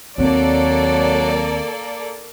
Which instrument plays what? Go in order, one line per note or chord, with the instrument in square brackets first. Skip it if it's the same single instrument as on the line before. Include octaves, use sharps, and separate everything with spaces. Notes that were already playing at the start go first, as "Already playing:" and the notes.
[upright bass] D#2 C4 [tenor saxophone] F#3 [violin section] A#3 A4 D5